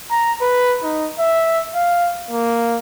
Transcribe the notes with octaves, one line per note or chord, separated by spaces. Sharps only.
A#5
B4
D#4
E5
F5
A#3